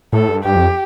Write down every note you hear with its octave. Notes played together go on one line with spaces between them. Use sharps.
A2 A4
G2
G2 G4
F2